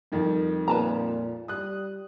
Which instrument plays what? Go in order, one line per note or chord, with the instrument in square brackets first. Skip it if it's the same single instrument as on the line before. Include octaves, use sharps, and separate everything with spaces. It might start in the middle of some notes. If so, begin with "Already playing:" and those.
[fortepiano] F2 D#3 G3
[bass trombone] A#2 [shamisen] B4 A5 A#5
[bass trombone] G3 [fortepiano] D#6 F#6